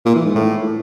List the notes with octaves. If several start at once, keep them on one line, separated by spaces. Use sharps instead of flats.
A#2
E3
G#2
A2